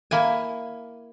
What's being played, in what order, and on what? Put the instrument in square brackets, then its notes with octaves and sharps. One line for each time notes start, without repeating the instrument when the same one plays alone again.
[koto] A#3 E4 G#5